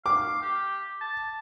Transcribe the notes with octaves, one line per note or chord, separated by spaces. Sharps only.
F5 D6
G4
A5